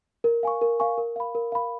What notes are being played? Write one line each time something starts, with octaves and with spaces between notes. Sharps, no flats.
A#4
F5 G#5 C#6
A#4
F5 G#5 C#6
A#4
F5 B5
A#4
F5 B5